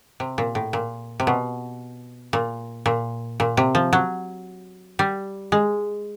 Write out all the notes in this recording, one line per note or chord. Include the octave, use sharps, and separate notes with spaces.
C3
A#2
A2
A#2
C3
B2
A#2
A#2
A#2
C3
F3
F#3
G3
G#3